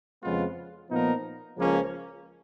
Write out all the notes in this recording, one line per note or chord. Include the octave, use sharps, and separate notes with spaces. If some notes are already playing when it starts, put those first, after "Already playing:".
F2 C#3 G#3 B3 F4
A#2 F3 B3 D#4 A#4
C#2 C#3 F3 A#3 C#4